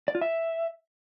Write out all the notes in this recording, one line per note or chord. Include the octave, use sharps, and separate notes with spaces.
D5
F4
E5